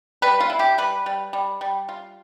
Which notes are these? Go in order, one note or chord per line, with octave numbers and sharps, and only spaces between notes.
G3 B4
F4
E4
G4
G3 B4
G3
G3
G3
F4